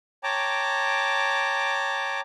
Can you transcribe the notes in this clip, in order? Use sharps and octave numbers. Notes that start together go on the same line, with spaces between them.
C#5 G5 A5 A#5 D6